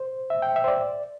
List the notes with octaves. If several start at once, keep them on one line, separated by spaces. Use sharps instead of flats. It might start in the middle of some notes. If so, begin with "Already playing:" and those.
Already playing: C5
E5
G5
E5
C5
D5